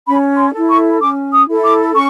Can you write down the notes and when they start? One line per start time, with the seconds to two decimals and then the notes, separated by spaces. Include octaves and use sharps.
0.06 C#4 B5
0.37 C6
0.52 E4 A4
0.68 C#6
1.00 C#4 D6
1.32 D#6
1.47 E4 A4
1.63 D6
1.94 C#4 C#6